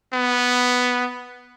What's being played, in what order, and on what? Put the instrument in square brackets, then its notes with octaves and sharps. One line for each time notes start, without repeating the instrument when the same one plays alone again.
[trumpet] B3